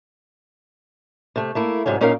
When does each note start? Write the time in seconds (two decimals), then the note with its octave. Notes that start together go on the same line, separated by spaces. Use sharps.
1.36 C3 A3
1.55 A3 A#3 E4
1.86 G#2 C3 F#3 C#4
2.01 A#2 C#4 D#4 A#4 D#5 F5